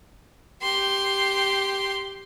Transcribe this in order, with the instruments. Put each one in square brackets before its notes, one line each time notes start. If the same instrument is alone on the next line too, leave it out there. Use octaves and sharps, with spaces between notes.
[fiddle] G4 C6